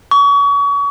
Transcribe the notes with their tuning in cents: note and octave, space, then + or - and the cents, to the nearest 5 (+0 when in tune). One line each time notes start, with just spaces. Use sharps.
C#6 +35